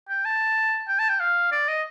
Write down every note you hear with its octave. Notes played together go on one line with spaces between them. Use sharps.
G5
A5
G5
A5
G5
F5
D5
D#5